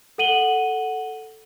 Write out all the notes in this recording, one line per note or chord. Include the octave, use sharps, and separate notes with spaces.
A4 F#5 D#7 F#7 G7